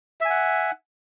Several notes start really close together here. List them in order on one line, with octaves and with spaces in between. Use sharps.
E5 G#5 F#5